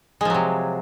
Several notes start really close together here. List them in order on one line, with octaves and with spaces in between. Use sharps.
G#3 F3 F#3 C3